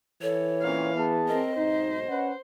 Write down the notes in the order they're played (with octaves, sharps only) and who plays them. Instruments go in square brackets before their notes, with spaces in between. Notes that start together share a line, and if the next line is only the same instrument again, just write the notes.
[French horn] E3 [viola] A4 [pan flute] C#5
[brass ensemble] A#2 A#3 C4 [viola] C#4 F5
[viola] B3 [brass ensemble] G#4 A5
[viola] C4 A#4 [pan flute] D#5
[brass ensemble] B1 G#2 [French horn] D#4 [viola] C5
[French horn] C#4 [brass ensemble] B4 F#5